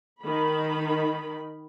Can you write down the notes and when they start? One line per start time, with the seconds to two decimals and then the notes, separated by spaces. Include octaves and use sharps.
0.22 D#3 B5